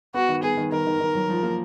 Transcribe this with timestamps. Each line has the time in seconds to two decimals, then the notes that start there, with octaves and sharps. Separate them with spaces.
0.14 B3 F#4
0.29 D#3
0.43 B3 G#4
0.57 D#3
0.72 D#3 A#4
0.87 D#3
1.00 D#3
1.15 F#3
1.29 F3
1.43 A#3